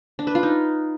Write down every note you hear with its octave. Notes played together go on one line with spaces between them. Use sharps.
D4
B4
F4
D#4